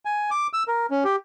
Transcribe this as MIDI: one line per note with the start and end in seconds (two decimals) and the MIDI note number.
0.05 0.30 80
0.31 0.47 86
0.53 0.63 88
0.68 0.86 70
0.90 1.04 61
1.04 1.16 67